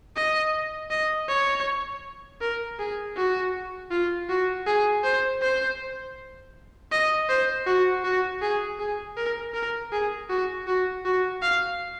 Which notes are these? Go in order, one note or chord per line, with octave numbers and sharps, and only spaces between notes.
D#5
D#5
C#5
A#4
G#4
F#4
F4
F#4
G#4
C5
C5
D#5
C5
F#4
F#4
G#4
G#4
A#4
A#4
G#4
F#4
F#4
F#4
F5